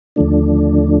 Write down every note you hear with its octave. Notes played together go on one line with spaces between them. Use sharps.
D#2 D3 F3 A3 D4